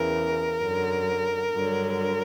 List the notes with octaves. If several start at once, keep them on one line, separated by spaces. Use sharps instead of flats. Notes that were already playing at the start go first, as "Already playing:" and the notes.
Already playing: E2 C#3 E3 A#4
F#2 D3 F#3
G2 D3 F#3